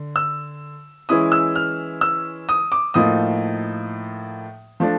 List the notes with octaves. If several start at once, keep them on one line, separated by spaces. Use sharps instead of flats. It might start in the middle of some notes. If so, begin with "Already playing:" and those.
Already playing: D3
E6
E3 G#3 C#4 E4 D#6
E6
F6
E6
D#6
D6
A2 F3 A#3 D#4 D#6
F3 A3 D4